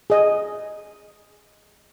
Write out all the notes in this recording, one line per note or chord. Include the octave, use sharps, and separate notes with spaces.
G#4 D#5